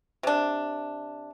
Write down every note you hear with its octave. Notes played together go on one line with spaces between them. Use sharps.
C3 D4